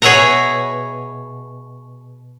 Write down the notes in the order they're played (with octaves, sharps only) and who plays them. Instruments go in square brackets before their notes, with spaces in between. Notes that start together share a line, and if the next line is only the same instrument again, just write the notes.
[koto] B2 G#4 C#5 E5 F#5 A#5